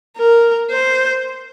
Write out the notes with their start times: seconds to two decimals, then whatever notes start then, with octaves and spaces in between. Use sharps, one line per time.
0.17 A#4
0.70 C5